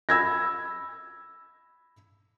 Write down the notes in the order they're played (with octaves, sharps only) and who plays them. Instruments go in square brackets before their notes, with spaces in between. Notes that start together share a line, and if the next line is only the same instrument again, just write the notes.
[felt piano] B5 E6 G#6 A#6